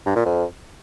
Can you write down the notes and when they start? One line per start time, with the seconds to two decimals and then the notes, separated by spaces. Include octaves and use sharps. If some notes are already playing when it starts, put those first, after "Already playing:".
0.06 G2
0.16 A#2
0.25 F2